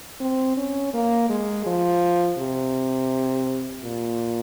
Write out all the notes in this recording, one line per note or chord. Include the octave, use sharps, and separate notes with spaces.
C4
C#4
A#3
G#3
F3
C3
A#2